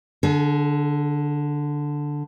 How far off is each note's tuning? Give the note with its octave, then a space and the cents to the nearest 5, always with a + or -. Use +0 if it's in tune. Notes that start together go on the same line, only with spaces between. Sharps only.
D3 +0 G#4 +40